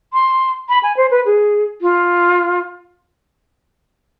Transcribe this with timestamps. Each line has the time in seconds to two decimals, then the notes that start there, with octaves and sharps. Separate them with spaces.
0.13 C6
0.69 B5
0.83 G#5
0.97 C5
1.11 B4
1.26 G#4
1.81 F4